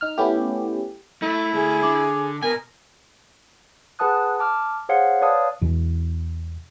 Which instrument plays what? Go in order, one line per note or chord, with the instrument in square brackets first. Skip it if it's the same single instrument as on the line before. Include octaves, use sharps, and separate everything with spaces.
[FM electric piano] D#4 F6
A3 B3 C#4 E4 G4
[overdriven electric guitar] A3 [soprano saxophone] E4
[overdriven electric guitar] D2 A3 [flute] G#4
[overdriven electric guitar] D3 [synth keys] D6
[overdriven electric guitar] B2 [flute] A#4 [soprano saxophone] G#5
[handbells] G#4 B4 F#5 A5 D#6 F#6
A5 D6 F6
G#4 C5 C#5 F5 F#5
B4 C#5 D5 F5 A5 D#6
[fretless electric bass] E2 B2 E3